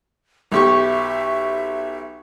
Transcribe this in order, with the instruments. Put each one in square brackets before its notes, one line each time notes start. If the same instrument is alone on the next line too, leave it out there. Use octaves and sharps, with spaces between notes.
[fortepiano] B1 G4 C#6 [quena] E5